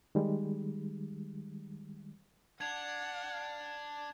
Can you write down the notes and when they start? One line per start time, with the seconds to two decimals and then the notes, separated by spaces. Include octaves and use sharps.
0.15 D#3 G3 G#3
2.61 D4 F#5 G#6 F7